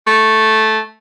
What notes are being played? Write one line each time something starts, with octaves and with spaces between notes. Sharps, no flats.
A3